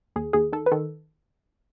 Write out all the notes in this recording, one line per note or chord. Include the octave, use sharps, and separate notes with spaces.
D#2 G#4
D#2 G#4
D#3 A4
B4
D#3 A4